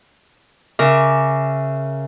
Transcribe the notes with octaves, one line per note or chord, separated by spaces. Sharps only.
C#3 A#4 E5 C#6 D6